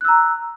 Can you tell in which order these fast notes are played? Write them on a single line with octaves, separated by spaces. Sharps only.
F#6 E6 A#5